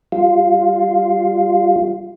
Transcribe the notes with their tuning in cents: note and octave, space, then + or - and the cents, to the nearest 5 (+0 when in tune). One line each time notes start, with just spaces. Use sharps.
G3 +0 F4 +0